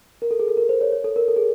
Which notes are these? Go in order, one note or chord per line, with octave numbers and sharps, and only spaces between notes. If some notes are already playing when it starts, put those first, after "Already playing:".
A#4
A4
G#4
A4
A#4
C5
C#5
C#5
A4
A#4
A4
G#4